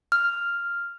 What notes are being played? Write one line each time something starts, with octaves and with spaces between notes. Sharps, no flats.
F6